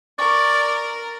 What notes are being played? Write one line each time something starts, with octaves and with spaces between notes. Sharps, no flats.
A#4 D5 C#6